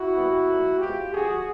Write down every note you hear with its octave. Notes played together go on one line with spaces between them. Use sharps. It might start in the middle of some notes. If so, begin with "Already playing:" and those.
Already playing: E4 F#4
A#2 G3 B3
A2 F3 A#3
B2 G#3 C4 F4 G4
D3 F3 A3 F#4 G#4